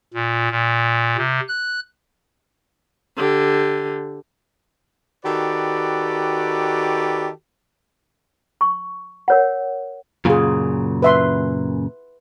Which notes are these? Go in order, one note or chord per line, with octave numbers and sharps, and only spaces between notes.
A#2
A#2
C3
F#6
D3 G4
D#3 F#4 G4 A4 B4 D5
C#6
A#4 C#5 F#5
F#2 A#2 C#3 F4 G#4
B4 E5 C6